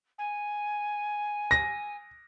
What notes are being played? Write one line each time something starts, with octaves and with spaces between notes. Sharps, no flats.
G#5
A#6